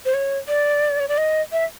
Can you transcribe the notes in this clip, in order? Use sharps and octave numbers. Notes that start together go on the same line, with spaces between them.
C5
C#5
D5
C#5
D5
D#5
E5